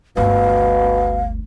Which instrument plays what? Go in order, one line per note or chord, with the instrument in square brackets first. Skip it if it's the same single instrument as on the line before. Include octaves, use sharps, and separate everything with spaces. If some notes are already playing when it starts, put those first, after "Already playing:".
[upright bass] G1 D2 [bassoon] B2 [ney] F5